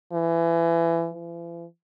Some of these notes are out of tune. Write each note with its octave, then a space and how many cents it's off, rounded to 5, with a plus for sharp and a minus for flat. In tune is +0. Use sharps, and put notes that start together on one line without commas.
E3 +25
E3 +45